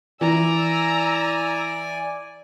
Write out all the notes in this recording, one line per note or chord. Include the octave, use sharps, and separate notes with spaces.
E3 D5 G#5 A#5 E6